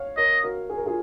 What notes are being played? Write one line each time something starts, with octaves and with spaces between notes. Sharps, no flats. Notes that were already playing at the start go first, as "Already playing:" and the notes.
Already playing: C#5 F5
A#4 C#5 D#5
F#4 A#4
G#4
A#4
F4 G#4